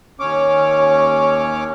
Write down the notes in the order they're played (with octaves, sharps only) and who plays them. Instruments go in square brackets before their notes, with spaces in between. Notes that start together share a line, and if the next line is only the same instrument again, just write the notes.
[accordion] D#2 C#4 C#5 D6